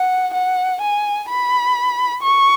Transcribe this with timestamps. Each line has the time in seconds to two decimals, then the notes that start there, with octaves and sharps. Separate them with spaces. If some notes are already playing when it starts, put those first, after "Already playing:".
Already playing: F#5
0.34 F#5
0.81 G#5
1.29 B5
2.23 C#6